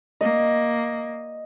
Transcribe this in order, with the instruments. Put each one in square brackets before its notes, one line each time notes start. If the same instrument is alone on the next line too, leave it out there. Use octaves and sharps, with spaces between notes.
[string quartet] A#3 [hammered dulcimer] D#5